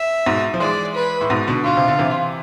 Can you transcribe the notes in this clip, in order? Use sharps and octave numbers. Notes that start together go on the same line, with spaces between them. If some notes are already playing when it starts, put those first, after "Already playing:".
Already playing: E5
G#2 B2
F3
E3 G#3 D5
B4
A2
G#2 B2
B2 D3
B2 F4
C3
D3
C3 E3